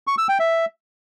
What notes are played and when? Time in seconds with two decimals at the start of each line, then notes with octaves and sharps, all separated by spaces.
0.07 C#6
0.18 E6
0.29 G5
0.40 E5